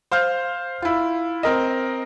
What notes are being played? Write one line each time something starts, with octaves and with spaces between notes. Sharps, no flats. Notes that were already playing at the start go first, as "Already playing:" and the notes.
C5 F5 F6 G6
E4 F4
C4 A#4 D#5